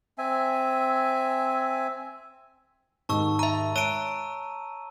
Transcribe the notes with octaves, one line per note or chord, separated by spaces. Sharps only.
C4 E5 G#5
D#2 G#2 A5 C#6 E6
E5 A#5
C#5 A5 A#5 E6 D7 D#7